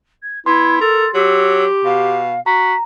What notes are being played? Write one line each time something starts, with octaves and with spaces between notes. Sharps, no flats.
G#6
B3 E4 C6 G#6
A4 A#4 A6
F#3 G4 E6
B2 F5
F#4 A#5 B6